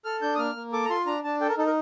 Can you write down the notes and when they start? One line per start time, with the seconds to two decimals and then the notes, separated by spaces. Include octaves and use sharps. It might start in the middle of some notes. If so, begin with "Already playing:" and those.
0.05 A4 F6
0.22 D4 G6
0.35 D#6
0.39 A#3 F6
0.56 A#3
0.73 A4 D6
0.85 A#5
0.90 F4 C6
1.06 D4 A#5
1.24 D4 A5
1.41 A4 G5
1.49 A#4
1.58 D#4 A4
1.66 A#4